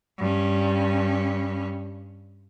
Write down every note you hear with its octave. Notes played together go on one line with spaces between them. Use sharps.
G2 C#4